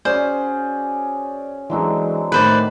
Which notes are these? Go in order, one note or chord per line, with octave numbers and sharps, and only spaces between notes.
C#4 F#4 G#4 C5 D5
D3 E3 F#3 G#3 C4
A2 D#3 B4 C5 D5